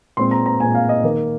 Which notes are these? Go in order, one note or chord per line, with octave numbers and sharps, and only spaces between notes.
A#2 G#3 C4 C6
A#5
A#5
A#2 G#3 C4 G#5
F5
D#5
D#3 A#3